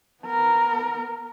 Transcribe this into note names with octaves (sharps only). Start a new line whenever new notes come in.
B3 A#4